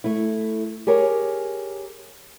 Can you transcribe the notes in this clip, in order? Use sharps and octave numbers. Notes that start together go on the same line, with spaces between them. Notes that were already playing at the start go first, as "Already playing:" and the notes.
A3 E4
G4 G#4 A#4 C#5